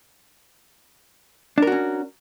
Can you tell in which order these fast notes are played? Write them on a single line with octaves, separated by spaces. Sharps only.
D4 A#4 F#4 C#4